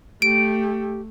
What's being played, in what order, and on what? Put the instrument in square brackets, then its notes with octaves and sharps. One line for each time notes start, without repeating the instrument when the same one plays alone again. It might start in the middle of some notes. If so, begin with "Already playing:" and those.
[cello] A3 [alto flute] G4 [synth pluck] D7